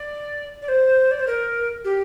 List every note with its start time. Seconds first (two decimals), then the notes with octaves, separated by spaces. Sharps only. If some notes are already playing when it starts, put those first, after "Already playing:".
Already playing: D5
0.61 D5
0.68 C5
1.11 D5
1.19 C5
1.27 A#4
1.84 G4